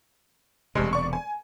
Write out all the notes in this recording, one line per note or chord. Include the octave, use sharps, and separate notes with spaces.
E1 G2 C3 G3 G#3
D5 C#6
G#5